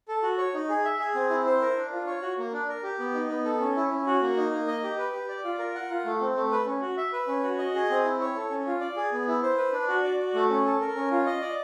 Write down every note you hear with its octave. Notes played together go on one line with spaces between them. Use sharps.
A4
F#4
C#5
D#4
G#4
E5
G#4
C4
E4
C5
A#4
D4
F4
C#5
F#4
A#3
D4
A#4
G4
B3
D#4
B3
A4
C#4
E4
C#4
F#4
A#3
D#4
A#3
D#5
G4
B4
G4
D5
F4
A#4
F#5
F4
A3
C4
A3
B4
C#4
F#4
E5
B4
C#4
F#4
D#5
G#4
C4
E4
C#5
A4
C#4
F4
D5
G#4
B3
E4
C5
B4
D4
F#4
D5
F#4
A3
C#4
A4
A#4
C#4
F4
D#5
D5